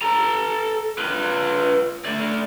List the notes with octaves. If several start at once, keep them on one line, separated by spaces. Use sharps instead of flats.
A4 A#5
F4 B4
A3 D5